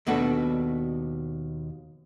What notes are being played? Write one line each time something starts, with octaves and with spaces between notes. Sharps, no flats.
D#2 B2 B3 D4 F#4 A4